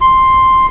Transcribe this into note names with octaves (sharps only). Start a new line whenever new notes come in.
C6